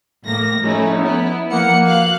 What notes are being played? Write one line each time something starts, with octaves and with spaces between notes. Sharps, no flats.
A2 A#3 A#6
F3 A3 C#4 D#4 E4
B3 E4
F3 A#3 F#5 C#7
F#4 F5 F#6